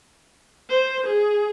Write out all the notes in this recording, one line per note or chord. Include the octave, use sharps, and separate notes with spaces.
C5
G#4